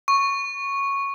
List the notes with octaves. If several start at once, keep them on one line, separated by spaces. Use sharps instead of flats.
C#6